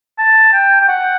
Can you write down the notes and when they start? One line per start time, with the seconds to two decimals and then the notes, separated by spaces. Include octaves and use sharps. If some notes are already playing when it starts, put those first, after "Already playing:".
0.18 A5
0.53 G5
0.81 G5
0.88 F#5